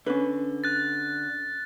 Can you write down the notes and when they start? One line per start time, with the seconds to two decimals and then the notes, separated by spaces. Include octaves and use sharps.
0.06 D3 C#4 B4
0.64 F#6 A6